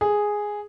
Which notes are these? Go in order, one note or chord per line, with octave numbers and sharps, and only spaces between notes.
G#4